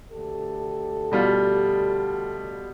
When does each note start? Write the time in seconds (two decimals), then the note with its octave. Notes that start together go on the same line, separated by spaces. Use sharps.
0.12 D2 G4 A4
1.11 B2 G3 F4